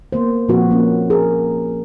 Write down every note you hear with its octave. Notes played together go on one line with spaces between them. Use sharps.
A#3 B3 C5
A#2 F3 C4 F#4 B4
A#3 C#4
G#4 A#4